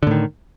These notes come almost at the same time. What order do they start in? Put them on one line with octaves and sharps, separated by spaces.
D3 A2 D#3